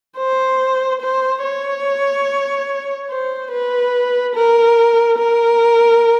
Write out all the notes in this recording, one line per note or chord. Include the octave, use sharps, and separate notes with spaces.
C5
C5
C#5
C5
B4
A#4
A#4